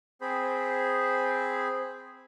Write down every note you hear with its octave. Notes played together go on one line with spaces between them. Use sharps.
C4 G#4 C5 B5